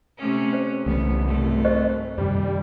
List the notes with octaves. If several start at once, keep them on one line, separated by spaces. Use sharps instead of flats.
C3 A3 C#4
C5
C2 C#3 E3 A3 B3
G#2 A3 C4
G4 C5 D#5
F#2 C3 D#3 G3